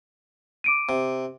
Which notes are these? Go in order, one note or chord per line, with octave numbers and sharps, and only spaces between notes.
D6 D7 D#7
C3